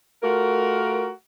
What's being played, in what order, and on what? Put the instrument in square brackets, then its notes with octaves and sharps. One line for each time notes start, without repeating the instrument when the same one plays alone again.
[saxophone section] A3 F4 F#4 A#4